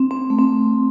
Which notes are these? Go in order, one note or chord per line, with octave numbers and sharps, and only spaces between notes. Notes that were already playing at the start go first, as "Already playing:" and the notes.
Already playing: C4
C4
A3
C4